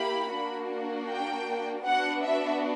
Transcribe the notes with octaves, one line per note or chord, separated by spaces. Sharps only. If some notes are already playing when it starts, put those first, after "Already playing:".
Already playing: A#3 E4 G4 B5
A#3 D4 F#4
G5
B3 D4 F#4 F#5
E5